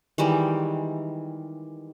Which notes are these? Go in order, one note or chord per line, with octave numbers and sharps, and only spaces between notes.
D#3 E3 G3 G#3